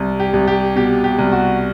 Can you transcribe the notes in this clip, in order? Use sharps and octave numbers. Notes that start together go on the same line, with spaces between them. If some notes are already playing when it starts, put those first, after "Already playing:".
Already playing: C2
G4
C2
G4
B2 G4
G4
C2
F#4